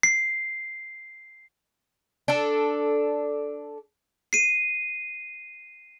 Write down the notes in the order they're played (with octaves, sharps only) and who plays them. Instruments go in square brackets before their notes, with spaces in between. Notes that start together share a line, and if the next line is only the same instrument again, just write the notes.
[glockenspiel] C7
[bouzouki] D4 A4
[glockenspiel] C7 D#7